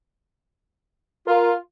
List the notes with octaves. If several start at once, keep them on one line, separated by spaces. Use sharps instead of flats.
F4 A#4